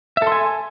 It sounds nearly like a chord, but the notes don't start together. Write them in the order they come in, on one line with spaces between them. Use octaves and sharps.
E5 A4 C6 G#5